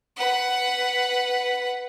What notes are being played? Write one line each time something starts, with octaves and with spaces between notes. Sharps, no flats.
B4 F#5